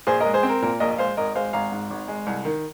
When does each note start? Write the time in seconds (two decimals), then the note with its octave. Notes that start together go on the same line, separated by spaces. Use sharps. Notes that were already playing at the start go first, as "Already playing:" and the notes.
0.07 A#1 G#4 C5
0.20 G#3 A#4 D#5
0.34 G#4 C5
0.43 C4
0.49 A#4
0.62 A#2 A#4
0.80 A#1 A#4 D#5
0.91 D#5
0.98 G#3 C5 F5
1.17 G#1 A#4 D#5
1.35 G#3 C5 F5
1.53 G#1 F5 A#5
1.72 G#2
1.90 G#1
2.08 G#3
2.26 C2
2.45 D#3